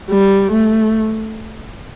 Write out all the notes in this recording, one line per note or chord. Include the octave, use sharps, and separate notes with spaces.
G3
A3